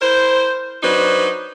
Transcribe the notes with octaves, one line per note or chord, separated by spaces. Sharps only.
E4 A#4 C5
F#3 D4 D#4 B4 C5